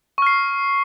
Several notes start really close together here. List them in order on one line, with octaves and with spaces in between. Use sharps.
C#6 F6 C7